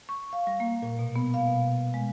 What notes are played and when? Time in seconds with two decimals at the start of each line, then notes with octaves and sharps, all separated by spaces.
0.09 C#6
0.33 F5
0.47 G3
0.60 A#3
0.82 A#2
0.99 B2
1.16 B3
1.34 F5
1.47 B2
1.94 G#3